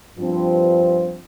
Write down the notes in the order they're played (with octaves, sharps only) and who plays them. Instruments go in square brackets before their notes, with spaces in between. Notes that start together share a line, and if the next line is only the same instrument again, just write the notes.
[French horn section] G2 F3 C4